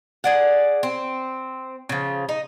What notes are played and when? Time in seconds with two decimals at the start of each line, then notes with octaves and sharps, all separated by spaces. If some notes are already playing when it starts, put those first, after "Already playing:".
0.24 G#4 D5 F#5
0.83 C4
1.89 C#3 F3
2.29 D#4